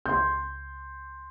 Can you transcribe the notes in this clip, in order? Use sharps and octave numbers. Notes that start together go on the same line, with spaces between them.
C#2 C6 G6